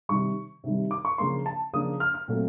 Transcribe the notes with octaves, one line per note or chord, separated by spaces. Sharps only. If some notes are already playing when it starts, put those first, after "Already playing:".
C3 D#3 G3 C#6
C3 D#3 G3
D6
C#6
C#3 F3 A#3 D4 C6
A5
C#3 F3 A#3 D4 D#6
F6
F6
A#2 F#3 A3 C4